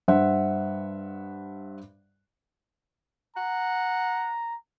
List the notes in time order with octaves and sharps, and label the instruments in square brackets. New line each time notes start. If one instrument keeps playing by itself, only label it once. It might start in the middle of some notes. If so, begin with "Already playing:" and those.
[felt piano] G2 C5 E5 F#5
[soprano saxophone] F#5 [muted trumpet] A#5